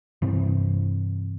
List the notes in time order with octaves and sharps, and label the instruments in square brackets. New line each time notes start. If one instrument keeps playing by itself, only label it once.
[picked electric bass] G2 C3 E3 C4